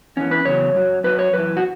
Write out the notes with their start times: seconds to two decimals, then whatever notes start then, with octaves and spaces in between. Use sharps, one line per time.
0.17 E2 E3 C#4
0.31 B4
0.45 E2 C#3 F#3 C#5
0.75 F#2 F#3
1.04 F#2 F#3 B4
1.19 C#5
1.33 F#2 E3 B4
1.57 F#4